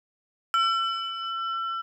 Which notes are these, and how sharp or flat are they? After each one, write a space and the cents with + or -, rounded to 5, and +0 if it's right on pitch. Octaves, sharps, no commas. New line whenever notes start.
E6 +35